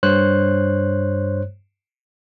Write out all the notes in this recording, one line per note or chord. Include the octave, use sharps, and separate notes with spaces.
G2 C5 C#5 F#6